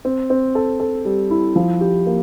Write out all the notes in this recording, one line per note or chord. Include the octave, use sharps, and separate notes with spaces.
C4
C4
A4
A4
G3
E4
F3
G4
A#3